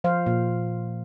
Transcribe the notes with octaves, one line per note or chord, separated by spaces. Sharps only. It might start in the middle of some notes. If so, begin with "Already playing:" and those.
F3 C5 F5
A#2